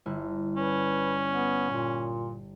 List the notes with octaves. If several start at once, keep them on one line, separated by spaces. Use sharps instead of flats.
G1 E4
C#4 B4
B3
A#2